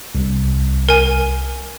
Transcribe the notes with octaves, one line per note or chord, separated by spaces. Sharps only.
C2
A#4 G#5